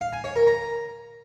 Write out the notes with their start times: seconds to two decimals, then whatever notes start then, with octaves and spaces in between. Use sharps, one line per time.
0.01 F5
0.13 G#5
0.24 C#5
0.36 A#4
0.47 A#5